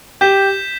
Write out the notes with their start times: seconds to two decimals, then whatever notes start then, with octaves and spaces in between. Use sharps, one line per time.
0.21 G4 G6 B6 E7 G7